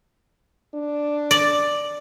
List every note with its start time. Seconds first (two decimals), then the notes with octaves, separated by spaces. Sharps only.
0.74 D4
1.31 D5